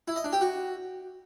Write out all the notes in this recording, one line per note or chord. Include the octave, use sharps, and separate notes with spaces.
E4
D#5
D4
G4
F#4